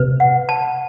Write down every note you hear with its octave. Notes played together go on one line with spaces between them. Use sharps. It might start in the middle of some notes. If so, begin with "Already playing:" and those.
Already playing: C3 B4
F#5
A5